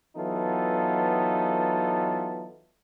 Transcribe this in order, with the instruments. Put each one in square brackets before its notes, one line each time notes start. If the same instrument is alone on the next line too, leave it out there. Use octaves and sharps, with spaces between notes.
[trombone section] E3 F#3 B3 D#4 F4 A4